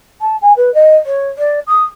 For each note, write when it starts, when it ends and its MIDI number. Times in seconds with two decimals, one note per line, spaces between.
0.21 0.37 81
0.42 0.53 80
0.57 0.73 71
0.74 0.95 75
1.06 1.28 73
1.38 1.60 74
1.67 1.83 87